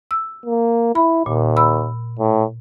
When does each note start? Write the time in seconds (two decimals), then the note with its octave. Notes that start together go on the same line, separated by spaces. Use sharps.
0.11 E6
0.46 A#3
0.95 E4 B5
1.26 D#2 A#2
1.57 B5 E6
2.19 A2